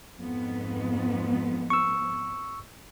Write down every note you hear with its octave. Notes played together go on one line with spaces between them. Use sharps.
F2 G#2 B3
C#6 E6